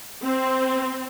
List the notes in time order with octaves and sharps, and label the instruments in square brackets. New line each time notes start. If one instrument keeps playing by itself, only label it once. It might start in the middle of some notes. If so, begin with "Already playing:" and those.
[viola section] C4